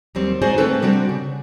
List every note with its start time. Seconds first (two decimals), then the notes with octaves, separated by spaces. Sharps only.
0.15 D#2 F#3 G3 C4
0.42 G#3 D#4 F#4 G#4 C5 D5
0.58 A3 B3 C4 A4 B4
0.82 C3 G3 C4 D4 F#4
1.09 C#3